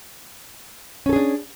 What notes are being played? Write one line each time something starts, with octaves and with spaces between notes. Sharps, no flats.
C#4 D4 G#4 A4